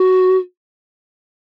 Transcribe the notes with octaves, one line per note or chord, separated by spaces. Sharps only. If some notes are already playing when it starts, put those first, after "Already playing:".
Already playing: F#4